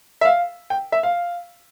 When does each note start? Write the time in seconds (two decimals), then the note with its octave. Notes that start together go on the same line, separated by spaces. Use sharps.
0.21 E5
0.25 F5
0.70 G5
0.92 E5
1.03 F5